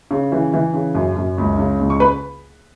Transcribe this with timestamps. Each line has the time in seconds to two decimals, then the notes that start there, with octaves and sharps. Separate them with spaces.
0.11 C#3
0.32 E3
0.54 E3
0.74 C#3
0.95 F#2
1.16 F#2
1.38 C#2
1.58 C#3
1.79 C#2
1.90 C#6
2.00 B4 B5